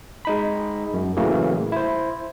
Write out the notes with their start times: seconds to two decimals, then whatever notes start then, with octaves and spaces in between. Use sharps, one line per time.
0.25 G#3 D#4 B5
0.94 F#2
1.17 A2 C#3 E3 F#3 A3 A#3
1.72 E4 C5